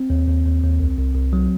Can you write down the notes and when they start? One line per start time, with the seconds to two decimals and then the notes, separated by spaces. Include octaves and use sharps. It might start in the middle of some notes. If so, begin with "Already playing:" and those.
Already playing: C4
0.10 D#2
0.28 D#2
0.46 D#2
0.63 D#2
0.79 C2
0.98 C2
1.15 C2
1.33 F#3